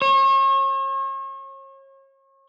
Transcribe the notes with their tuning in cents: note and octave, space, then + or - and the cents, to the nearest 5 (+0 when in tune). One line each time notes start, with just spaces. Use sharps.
C#5 -40